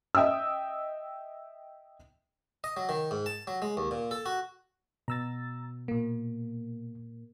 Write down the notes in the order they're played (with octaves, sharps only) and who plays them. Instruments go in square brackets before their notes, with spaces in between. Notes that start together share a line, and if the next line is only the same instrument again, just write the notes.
[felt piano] D#5 E5 G5 D#6 E6
[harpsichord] D#5
F#3
D#3
G#2
A5
F#3
G#3
D#2
A#2
A4
F#4
[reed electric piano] B2 [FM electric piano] A#5 E6 A6
[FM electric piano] A#2 A#3